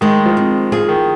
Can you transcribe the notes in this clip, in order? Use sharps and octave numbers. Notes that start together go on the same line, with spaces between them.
D#3 G#3
F3
C4
F3 G#4
D#3